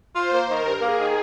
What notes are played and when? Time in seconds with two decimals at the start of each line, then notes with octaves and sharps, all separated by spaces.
0.15 F4 C5
0.32 A#3
0.48 D#3 A#4
0.65 G2
0.82 A#3 G#4
0.99 D#3